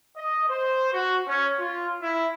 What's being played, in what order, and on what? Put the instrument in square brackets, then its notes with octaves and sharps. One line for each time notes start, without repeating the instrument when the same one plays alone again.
[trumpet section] D#5
C5
F#4
C#4
F4
E4